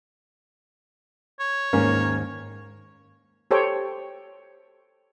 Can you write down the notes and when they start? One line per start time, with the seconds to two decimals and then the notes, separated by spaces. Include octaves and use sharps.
1.40 C#5
1.73 D#2 G#2 D#3 A#3 C#4
3.51 G4 A4 C5 C#5 G5